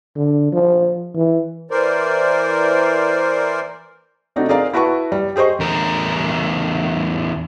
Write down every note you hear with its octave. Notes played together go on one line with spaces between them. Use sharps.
D3
F3
E3
E3 A#4 C5 D5
C3 A3 C4 D4 D#4 F#4
C4 G#4 A#4 D5 F5
E4 F#4 B4 A5 C#6
G3
G4 G#4 C5 D#5 C#6
E2 A#4